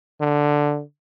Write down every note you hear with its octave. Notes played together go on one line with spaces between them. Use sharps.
D3